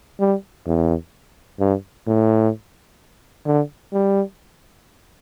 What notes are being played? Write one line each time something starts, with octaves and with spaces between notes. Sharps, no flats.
G3
E2
G2
A2
D3
G3